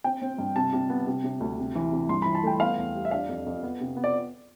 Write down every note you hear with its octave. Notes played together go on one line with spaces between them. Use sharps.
C4 G5
C4
G2
C3 A5
C3
B3
C3
C3
D2
C3
E3
C3
G2 C6
E3 B5
A5
A3 G5
B3 F5
E2
G3
E5
D4 F5
F2
F2
B3
C3
B3
D5